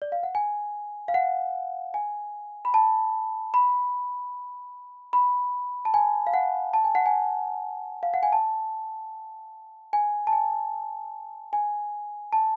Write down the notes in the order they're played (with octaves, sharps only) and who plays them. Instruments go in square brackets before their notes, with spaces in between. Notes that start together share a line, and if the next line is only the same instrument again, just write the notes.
[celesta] D5
F5
F#5
G#5
F5
F#5
G#5
B5
A5
B5
B5
A5
G#5
F5
F#5
A5
G#5
F#5
G#5
F5
F#5
G#5
A5
G#5
A5
G#5
G#5
A5